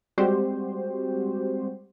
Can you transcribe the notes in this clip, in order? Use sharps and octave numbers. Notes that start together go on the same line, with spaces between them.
G3 G#3 C4 F#4 G4 C5